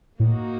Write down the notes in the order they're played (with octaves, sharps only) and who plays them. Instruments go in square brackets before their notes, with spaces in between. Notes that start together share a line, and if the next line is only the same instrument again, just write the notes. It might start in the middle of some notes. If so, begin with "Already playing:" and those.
[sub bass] A2 [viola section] A#3 D#4 F#4